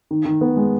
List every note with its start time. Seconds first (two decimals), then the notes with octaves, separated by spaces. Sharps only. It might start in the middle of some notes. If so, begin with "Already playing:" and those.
0.11 D#3
0.25 D#3
0.41 B3
0.57 G#3